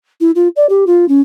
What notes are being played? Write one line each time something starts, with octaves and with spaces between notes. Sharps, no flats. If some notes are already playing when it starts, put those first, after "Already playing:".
E4
F4
D5
G4
F4
C#4